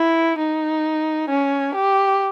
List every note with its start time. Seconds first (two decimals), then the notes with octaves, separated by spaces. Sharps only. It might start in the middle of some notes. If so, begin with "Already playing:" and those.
Already playing: E4
0.38 D#4
1.29 C#4
1.74 G4